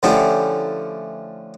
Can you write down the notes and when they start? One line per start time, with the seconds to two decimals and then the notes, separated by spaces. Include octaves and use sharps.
0.03 D3 F3 A3 C#4 E4 G4